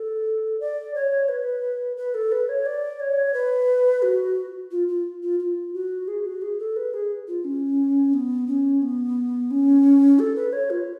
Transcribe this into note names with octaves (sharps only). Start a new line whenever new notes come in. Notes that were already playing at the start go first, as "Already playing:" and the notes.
Already playing: A4
D5
C#5
B4
B4
A4
B4
C#5
D5
C#5
B4
F#4
F4
F4
F4
F4
F#4
G#4
F#4
G#4
A4
B4
G#4
F4
C#4
B3
C#4
B3
C#4
A4
B4
C#5
F4